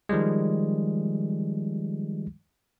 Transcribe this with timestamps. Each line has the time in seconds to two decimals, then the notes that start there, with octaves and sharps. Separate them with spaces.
0.09 D#3 F3 G3 G#3